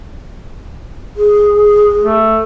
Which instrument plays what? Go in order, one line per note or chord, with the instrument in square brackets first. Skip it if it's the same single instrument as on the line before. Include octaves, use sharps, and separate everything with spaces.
[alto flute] G#4
[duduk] A3